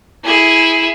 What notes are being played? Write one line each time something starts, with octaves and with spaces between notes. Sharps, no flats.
E4 G#4